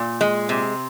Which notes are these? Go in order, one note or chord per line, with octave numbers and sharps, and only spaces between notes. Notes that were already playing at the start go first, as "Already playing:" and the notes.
Already playing: A#2
G#3
C3